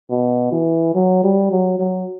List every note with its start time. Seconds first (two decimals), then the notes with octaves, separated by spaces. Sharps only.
0.10 B2
0.52 E3
0.95 F#3
1.23 G3
1.51 F#3
1.79 F#3